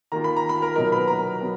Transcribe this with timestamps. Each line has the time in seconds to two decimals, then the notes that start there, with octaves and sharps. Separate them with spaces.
0.12 D#3 A#3 F4 A#5
0.24 B5
0.37 A#5
0.49 B5
0.62 A#4 A#5
0.76 B2 F#3 A#3 D#4 A#4 A#5
0.92 B4 B5
1.08 A#4 A#5
1.41 F#3 B3